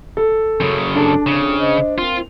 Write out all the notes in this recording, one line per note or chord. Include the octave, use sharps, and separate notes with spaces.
A4
F#2 C#3
D4 G#4 A4 A5
C2 F2 C#3
C5 D#5
A#3 C4 F4 C5